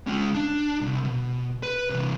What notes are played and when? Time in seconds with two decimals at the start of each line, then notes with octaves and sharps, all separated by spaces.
0.07 G#3 C#4
0.34 D4
0.81 C2
1.05 B2
1.63 B4
1.90 C3 E3